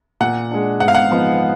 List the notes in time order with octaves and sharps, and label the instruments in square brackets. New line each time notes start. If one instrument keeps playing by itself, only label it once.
[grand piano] A#2 [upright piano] F#5
[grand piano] G#3 D4
[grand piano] G#2 [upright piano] F#5
[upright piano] F5
F#5
[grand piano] F3 B3 D#4